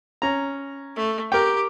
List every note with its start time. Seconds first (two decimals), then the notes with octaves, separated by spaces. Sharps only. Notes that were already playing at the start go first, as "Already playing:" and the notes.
0.22 C#4 A#5
0.96 A3
1.32 G4 A#4 G5